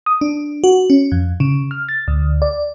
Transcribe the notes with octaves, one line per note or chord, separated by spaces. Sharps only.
D#6
D4
F#4
C#4
F2
C#3
F6
A6
D2
D5